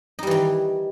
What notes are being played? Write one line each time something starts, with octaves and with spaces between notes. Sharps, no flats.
D#3 E3 G3 D#4